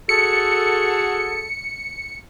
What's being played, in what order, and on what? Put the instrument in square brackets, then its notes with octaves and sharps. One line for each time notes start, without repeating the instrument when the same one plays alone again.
[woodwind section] F#4 G#4 A4 [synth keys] C#7